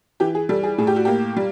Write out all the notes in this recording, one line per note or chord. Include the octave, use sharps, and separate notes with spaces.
E3 G4
G#4
G3 A4
G#4
A2 G#4
G4
F#4
A#3 G4
G3